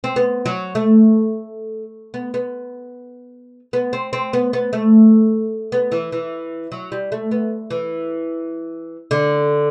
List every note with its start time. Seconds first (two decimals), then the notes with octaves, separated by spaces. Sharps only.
0.04 C4
0.16 B3
0.46 F#3
0.75 A3
2.14 B3
2.34 B3
3.73 B3
3.93 C4
4.13 C4
4.33 B3
4.53 B3
4.73 A3
5.72 B3
5.92 E3
6.12 E3
6.72 F#3
6.92 G3
7.12 A3
7.31 B3
7.70 E3
9.11 D3